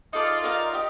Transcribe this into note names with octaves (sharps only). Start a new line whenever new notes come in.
D#4 F4 A4 D5
D#4 A#4 D5 F5
D#4 G4